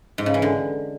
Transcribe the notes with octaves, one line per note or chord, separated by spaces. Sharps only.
G#2
C#3
E3
D3